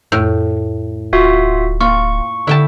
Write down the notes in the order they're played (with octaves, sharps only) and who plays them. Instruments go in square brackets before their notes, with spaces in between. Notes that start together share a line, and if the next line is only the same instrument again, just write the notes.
[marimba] F2 E6 G6 [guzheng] A2
[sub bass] D1 [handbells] F4 F#4 E5
[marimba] A#3 [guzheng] F4 [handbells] C#6
[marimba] D3 A4 [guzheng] E4 G5 A5